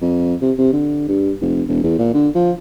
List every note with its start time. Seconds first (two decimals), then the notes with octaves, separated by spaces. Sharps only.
0.02 F2
0.42 C3
0.58 C3
0.73 D3
1.08 G2
1.41 F1
1.68 E1
1.84 E2
1.99 A#2
2.14 D3
2.35 F3